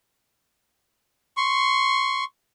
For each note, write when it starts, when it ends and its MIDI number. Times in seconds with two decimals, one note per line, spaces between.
1.37 2.24 84
1.37 2.24 85